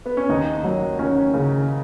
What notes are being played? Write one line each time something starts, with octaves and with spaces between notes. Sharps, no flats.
B3
C#4
D#2 D#4
F#3
C#4
C#3